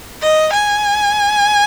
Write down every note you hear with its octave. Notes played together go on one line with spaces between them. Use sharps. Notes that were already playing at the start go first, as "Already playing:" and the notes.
D#5
G#5